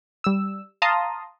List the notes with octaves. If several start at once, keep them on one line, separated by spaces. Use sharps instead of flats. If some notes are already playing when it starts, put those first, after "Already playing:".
G3 E6
F5 A5 A#5 C6 D#6